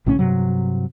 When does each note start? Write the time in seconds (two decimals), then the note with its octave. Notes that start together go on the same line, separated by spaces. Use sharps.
0.06 A#1 A2 C#3 C#4
0.19 G2 C3 F#3